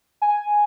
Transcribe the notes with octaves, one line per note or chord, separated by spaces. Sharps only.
G#5